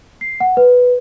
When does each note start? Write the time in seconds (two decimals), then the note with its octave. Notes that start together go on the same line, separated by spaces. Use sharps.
0.21 C7
0.40 F#5
0.57 B4